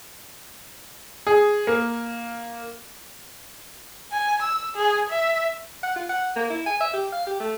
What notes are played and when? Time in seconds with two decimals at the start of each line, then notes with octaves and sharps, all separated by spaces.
1.27 G#4
1.67 A#3
4.12 G#5
4.42 E6
4.75 G#4
5.10 E5
5.83 F#5
5.96 F4
6.09 F#5
6.36 A#3
6.50 E4
6.67 G#5
6.80 E5
6.94 G4
7.13 F5
7.27 G4
7.40 A3